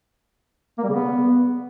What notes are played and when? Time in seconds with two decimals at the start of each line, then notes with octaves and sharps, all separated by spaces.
0.78 A#3
0.84 G3
0.89 C#3
0.94 B3